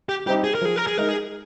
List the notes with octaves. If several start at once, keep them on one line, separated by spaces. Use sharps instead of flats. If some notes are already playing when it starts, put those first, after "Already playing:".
G4
G3 C4 D#4 G4
G#4
A#4
F3 G#4
A#4
G#4
G#3 D#4 A#4
G#4